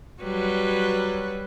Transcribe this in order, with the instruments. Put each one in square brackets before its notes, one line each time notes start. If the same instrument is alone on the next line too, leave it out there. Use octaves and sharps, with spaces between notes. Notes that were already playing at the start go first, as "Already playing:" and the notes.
[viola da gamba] F#3 G3 B4